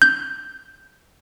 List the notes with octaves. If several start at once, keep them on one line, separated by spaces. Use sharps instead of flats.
G6